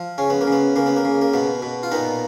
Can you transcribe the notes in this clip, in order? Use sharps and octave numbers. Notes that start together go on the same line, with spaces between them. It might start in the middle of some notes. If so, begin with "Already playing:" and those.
Already playing: F3
C#3 C#4
B3
A#3
C#3 B3
C#3 A#3
B3
A#3
C#3
A#3
B2 B3
B2
F4
A#2 B3 D#4